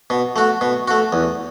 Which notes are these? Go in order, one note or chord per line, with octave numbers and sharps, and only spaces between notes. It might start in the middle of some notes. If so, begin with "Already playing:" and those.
B2
A3 F#4
B2
A3 F#4
E2